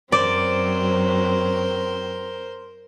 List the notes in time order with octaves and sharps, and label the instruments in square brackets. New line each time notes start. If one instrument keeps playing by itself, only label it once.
[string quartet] F#2 F#3 C4 [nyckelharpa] A#4 C5 [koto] D5